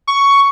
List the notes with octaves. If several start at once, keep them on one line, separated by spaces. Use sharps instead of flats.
C#6